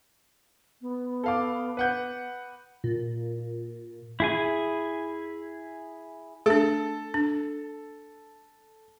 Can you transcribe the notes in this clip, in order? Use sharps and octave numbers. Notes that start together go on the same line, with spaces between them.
B3
A4 F5 D6
B4 F#5 G6
A#2
E4 G#4 G#5
A3 D4 A4
D4